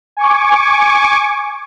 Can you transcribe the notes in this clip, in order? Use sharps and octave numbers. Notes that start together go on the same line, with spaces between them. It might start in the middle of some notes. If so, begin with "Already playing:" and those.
G#5 C#6 D6